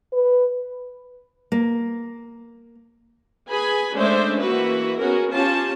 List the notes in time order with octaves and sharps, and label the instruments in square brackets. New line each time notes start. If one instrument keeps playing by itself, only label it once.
[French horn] B4
[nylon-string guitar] A#3
[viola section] G#4 B4 G#5 B5
G#3 A3 C#4 D4 C5 E5
E3 A#3 F#4 B4 E5
B3 C#4 F#4 G#4 A#4
C#4 F4 G4 A5